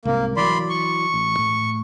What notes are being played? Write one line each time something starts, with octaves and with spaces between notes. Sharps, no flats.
C2 G#2 C3 A#3
E3 F#3 D5 B5 C6
C#6
A1
A2